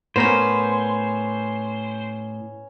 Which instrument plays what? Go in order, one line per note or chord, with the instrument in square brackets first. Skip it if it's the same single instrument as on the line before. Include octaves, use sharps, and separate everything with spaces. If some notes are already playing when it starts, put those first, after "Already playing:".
[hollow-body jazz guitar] A2 A#4 [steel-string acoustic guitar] B3 C#4 [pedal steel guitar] C5